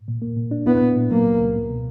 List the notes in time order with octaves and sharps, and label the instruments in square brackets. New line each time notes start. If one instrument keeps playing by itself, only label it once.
[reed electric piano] A#2
A#3
A#2
D4
[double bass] B3 [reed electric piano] E4
[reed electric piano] A#2
A#2
[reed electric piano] F#3 [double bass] A#3
[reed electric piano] C#2
C#2
A#3
B2